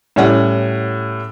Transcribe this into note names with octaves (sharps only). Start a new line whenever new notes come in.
A2 G3 C#4 F#5